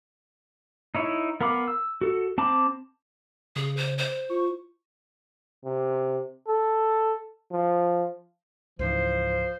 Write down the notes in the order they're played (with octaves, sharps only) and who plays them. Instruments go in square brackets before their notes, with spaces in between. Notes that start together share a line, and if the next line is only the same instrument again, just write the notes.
[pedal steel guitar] D#4 E4 C#5
B3 A#4 F5 B5 D6
E6
F#4 A4
C4 A5 B5 D6
[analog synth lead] C#3 [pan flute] G#4
[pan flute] C5
C5
[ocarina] F4 [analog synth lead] C#6
[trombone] C3
A4
F3
[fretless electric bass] C#2 G#2 E3 [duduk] F3 [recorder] C5